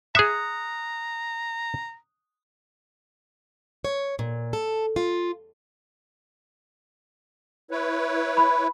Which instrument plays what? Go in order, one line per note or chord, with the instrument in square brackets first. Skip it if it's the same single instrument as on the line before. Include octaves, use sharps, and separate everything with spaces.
[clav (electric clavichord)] G#4 E5 [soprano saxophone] A#5 [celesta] D#6 F#6 C#7
[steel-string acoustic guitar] C#5
A#2
A4
F4
[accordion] E4 B4 C#5
[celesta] B5